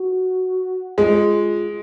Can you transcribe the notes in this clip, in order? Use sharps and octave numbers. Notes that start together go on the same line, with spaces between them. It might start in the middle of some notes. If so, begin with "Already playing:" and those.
Already playing: F#4
G#3 F4